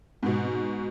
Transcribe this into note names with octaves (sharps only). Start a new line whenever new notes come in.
G#2 B2